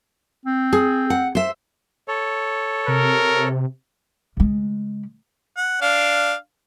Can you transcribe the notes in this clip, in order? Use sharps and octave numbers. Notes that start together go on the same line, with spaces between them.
C4
G#4
F#5
C5 E5
A4 C#5
C3 A#4
C#3 G#3
F#5
D4 F5